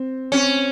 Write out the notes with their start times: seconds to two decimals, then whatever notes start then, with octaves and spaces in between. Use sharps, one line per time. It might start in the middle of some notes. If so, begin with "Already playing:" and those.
Already playing: C4
0.32 C4 C#4